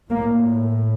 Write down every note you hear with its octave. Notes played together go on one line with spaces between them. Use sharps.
A2 A#3